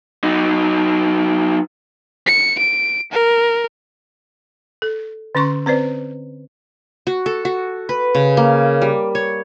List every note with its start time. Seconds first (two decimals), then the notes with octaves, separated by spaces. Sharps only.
0.24 F#3 D#4
2.26 C#7
2.58 D7
3.11 A#4
4.82 A4
5.35 D3 C#4 C6 C#6
5.66 C4 B4 C5 D5
7.07 F#4
7.26 A4
7.45 F#4
7.89 B4
8.15 C#3
8.37 A#3
8.82 G3
9.15 C#5